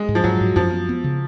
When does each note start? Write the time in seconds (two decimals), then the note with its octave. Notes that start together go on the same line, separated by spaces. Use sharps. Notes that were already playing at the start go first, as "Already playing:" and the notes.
Already playing: G#3
0.09 G#2
0.15 F3
0.24 G#2 F#3
0.41 G#2
0.56 F#2 F3
0.72 B3
0.89 B3
1.04 C#3